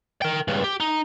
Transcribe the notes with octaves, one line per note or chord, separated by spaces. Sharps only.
A#4 G5
C#2 G2
G4
D#4